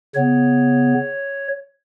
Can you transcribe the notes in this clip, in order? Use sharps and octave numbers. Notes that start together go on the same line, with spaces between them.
C#3 B3 C#5